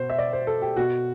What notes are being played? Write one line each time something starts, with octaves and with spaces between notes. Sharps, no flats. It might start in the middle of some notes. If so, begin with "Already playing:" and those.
Already playing: B2 C5
E5
D5
C5
A4
G4
B2 F#4